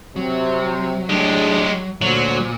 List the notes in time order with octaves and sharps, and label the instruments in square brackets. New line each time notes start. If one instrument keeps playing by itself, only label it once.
[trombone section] C3 C4 [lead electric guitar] F#3
[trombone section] A2 D4 G#4 [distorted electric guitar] G#3 G4
[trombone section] D2 D3 C5 [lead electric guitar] A#2 [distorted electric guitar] F#3